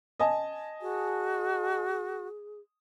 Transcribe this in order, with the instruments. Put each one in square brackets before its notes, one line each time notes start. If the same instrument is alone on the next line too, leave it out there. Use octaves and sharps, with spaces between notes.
[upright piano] D#5 G#5 A5
[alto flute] F#4 [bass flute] G#4